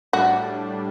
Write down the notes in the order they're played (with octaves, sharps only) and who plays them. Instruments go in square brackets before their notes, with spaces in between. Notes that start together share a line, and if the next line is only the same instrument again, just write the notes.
[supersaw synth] A2 G3 D4 [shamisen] F#4